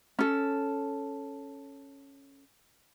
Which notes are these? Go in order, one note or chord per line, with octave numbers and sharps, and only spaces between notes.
C#4 A4